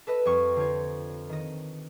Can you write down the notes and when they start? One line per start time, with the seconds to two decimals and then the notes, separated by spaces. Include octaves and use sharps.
0.07 A4 B4 D#5
0.25 F2 G3 C#6
0.56 D3 F4 C5 C#5
1.29 D#3 D#5